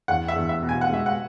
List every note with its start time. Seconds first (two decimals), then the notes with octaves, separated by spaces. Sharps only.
0.08 E2 F#5
0.28 E5
0.36 E2
0.49 E5
0.62 B2
0.69 G#5
0.81 F#5
0.90 G#3 E5
1.06 F#5